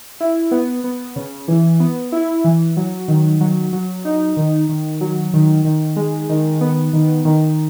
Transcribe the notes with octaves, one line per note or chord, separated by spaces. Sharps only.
E4
B3
B3
C#3
E3
B3
E4
E3
F#3
D#3
F#3
F#3
D#4
D#3
D#3
F#3
D#3
D#3
G#3
D#3
B3
D#3
D#3